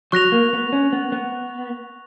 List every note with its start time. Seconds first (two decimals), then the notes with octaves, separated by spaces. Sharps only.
0.12 F#3 C#6 F#6 A#6 F7
0.32 A#3
0.53 B3
0.73 C#4
0.93 B3
1.12 B3